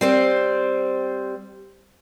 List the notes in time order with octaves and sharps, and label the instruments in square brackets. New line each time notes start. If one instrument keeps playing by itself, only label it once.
[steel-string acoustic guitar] G3 C4 C5